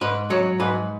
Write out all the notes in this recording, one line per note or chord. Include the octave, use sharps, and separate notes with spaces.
G#2 B4
F#3 C#5
G#2 B4